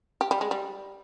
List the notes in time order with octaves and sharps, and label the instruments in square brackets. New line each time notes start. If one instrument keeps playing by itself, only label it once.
[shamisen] G4
G3
G#3
G3